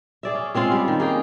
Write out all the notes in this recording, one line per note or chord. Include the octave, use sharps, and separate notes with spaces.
G#4 D5 E5
C#4
G#3 C4 C#4 F4
G3
D#3
A#3 G#4 G5